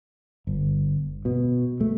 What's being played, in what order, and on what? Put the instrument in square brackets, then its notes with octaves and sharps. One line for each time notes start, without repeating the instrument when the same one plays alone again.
[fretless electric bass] G1
B2
A3